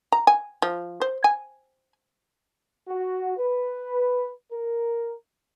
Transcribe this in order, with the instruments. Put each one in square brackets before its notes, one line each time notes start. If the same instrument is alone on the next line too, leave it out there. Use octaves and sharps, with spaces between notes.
[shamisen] A#5
G#5
F3
C5
G#5
[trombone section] F#4
B4
A#4